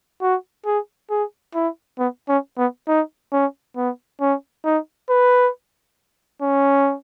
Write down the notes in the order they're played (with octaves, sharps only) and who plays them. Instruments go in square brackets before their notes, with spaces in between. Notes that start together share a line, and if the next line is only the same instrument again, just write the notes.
[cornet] F#4
G#4
G#4
E4
B3
C#4
B3
D#4
C#4
B3
C#4
D#4
B4
C#4